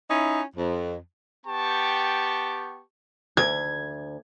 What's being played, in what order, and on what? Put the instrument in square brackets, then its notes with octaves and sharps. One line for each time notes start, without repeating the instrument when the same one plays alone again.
[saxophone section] C#4 D#4 E4
F2
[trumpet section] B3 G4 G5 A5 C#6
[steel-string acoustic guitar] D2 [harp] G#6